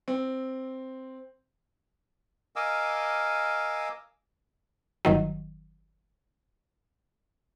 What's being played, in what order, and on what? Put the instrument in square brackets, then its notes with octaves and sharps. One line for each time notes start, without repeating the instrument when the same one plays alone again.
[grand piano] C4
[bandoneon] A#4 D#5 F5 G#5 D6 E6
[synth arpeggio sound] G1 D#3 F#3